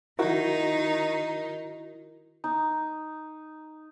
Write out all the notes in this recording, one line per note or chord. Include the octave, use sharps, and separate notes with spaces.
D#3 D#4 E4 F#4 A#4
D#4